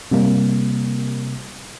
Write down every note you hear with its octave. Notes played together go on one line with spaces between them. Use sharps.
C3 G3 A#3